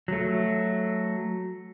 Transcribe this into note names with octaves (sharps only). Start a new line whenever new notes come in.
F#3 A3